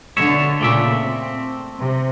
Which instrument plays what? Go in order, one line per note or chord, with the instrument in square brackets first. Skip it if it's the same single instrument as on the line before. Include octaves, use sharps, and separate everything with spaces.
[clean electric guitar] B2 C#5 E5 [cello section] D3
[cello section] A#2 C#3 [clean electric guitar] A3 D5 E5
[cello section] C4
C3